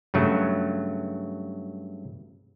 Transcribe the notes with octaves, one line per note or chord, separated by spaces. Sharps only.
G2 C#3 F#3 A3